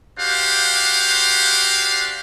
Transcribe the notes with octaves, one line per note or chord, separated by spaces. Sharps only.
D4 F#4 G4 C5 F5